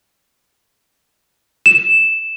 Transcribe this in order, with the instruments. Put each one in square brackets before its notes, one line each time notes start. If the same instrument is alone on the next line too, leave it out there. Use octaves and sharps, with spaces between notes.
[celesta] E7